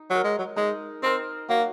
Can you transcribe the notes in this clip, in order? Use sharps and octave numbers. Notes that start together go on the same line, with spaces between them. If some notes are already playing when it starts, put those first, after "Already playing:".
Already playing: D#4
F#3 A#4 D#5
G#3
F#3
G#3 D#4
C4 A#4 D#5
F#3 A#3